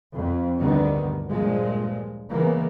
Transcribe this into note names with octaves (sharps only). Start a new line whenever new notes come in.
F2
D2 G2 B2 D3 D#3 B3
G2 A#2 F3 G#3
C#3 E3 G#3 A#3 B3